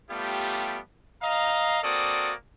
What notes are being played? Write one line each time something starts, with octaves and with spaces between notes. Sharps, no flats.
G3 A3 B3 F4 G4
D#5 F5 A#5
A#3 C4 F#4 A4 D5 D#6